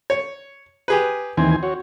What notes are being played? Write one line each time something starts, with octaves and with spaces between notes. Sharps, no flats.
C#5
G4 G#4 B4
D#2 E3 C4 G#5
F#4 C#5